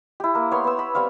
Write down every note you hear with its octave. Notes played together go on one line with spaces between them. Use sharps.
E4 G4
A#3
B3 C#5 C6
B3 E6
B5
G3 C4 C#5 F5